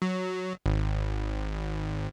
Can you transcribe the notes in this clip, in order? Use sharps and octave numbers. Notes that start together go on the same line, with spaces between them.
F#3
G#1